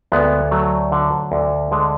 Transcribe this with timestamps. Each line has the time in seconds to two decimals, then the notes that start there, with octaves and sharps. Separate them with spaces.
0.12 D2 G#3 B3
0.51 F#3 A3
0.92 D3
1.32 D2
1.71 D3 G#3